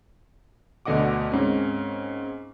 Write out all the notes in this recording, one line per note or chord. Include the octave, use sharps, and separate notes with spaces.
D2 B2 D3 D#5 F#5 D6
G#2 A#3 C4 C#4